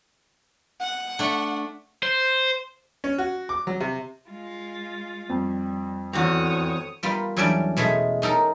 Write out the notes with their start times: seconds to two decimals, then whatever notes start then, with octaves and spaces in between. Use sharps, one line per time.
0.80 F#5
1.19 A3 D4
2.03 C5
3.04 C#4
3.18 F#4
3.49 D6
3.67 F#3
3.80 C3
4.30 G#3 F4
5.29 F2 G3
6.13 E2 G#2 C4 F#4 A4 C#5 D#6
7.03 G3 B3 F4 A#4
7.37 E2 F#3 G3 C#4 D4 D5
7.77 B2 G#3 A3 C#4 G#4
8.22 C#4 D#4 A4 A#4